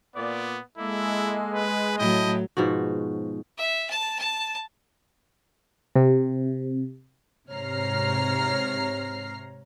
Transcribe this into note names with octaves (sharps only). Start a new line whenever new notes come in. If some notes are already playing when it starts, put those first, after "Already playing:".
A#2 B3 D5
G#3 A#3 E4 A4
B4
A2 F#3 E4 D#5 G5 A5
G#2 B2 F3 F#4
E5
A5
A5
C3
G#2 C3 C#5 A#5 F6 C7